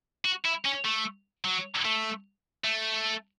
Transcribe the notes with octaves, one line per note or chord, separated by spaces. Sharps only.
F#4
E4
C#4
A3
F#3
A3
A3